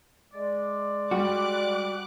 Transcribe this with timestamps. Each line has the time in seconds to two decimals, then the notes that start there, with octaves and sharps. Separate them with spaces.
0.32 G#3 D5
1.11 G3 F#4 D6 F#6